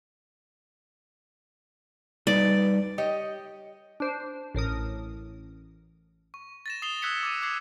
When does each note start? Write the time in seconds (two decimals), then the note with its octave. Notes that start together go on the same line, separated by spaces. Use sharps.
2.27 G3 D#4 B4 D5
2.98 G4 C#5 D#5
4.00 D4 C5
4.55 A1 A2 A#4 D#6
6.34 C#6
6.66 A6 A#6 E7
6.82 D#6 C7 F7 G7
7.02 D#6 E6 F#6 G#6 B6 C#7
7.23 D6 A6 D#7
7.42 D6 E6 G#6 B6 C7